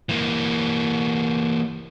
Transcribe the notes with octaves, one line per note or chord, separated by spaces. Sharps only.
E3 A#3